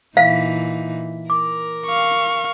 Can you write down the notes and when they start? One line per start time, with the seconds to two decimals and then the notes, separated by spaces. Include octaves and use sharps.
0.17 A#2 E3 D#4 E5 F5 B6
1.30 A#4 D6
1.86 F5 C#6